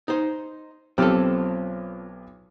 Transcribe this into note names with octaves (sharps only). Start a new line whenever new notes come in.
D#4 C5
B1 C4 F4 G4 A4 F6